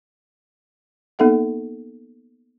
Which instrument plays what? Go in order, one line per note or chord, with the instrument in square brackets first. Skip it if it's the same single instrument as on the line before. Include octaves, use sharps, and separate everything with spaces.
[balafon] A#3 B3 D#4 A4 E5 F#5